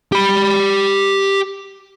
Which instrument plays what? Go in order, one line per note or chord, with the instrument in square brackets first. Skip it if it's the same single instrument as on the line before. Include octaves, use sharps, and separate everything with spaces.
[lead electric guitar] G4 B5